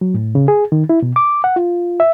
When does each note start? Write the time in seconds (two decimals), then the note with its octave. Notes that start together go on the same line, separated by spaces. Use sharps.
0.01 F#3
0.14 A2
0.35 C#3
0.48 G#4
0.72 D#3
0.89 E4
1.02 B2
1.16 D6
1.44 F#5
1.56 F4
2.00 E5